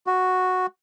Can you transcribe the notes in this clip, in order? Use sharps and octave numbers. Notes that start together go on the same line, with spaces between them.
F#4